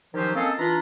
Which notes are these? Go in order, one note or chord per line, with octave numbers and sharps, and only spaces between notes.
D#3 F3 F#3 C#4 G4 C5
A#3 C4 C#4 A4 D#5 F5
E3 D4 F4 A#5 B5